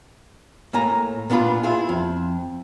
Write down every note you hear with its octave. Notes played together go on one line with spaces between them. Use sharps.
A2 A#3 G#5 A#5
A#2 B3 D4 F4 B5
E4 F4 G#4
F2